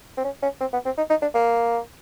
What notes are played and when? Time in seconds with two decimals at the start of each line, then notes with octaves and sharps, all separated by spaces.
0.17 C4
0.24 C#4
0.43 C#4
0.61 C4
0.73 B3
0.85 C4
0.97 D#4
1.10 D#4
1.22 D4
1.34 A#3